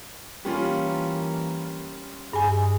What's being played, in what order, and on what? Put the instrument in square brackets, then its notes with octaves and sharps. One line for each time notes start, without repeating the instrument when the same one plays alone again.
[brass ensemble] E3 A#3 [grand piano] G3 C#4 F4
[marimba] G2 G#5 [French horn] G#4